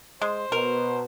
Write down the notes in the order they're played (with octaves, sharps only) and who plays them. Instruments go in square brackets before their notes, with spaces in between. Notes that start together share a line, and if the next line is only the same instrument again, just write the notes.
[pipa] G#3 [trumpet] C5
[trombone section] B2 [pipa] A#4